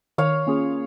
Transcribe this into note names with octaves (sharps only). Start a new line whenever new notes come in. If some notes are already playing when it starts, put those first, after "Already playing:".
D#3 C#5 F5
A#3 C#4 F4 G#4